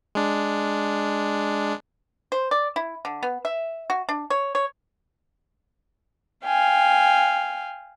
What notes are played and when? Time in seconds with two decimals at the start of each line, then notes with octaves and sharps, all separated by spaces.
0.15 G#3 D4
2.32 C5
2.51 D5
2.76 E4
3.05 D3
3.23 B3
3.45 E5
3.90 F#4
4.09 D4
4.30 C#5
4.55 C#5
6.45 F5 G5 G#5